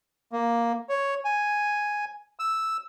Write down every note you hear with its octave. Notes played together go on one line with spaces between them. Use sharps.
A#3
C#5
G#5
E6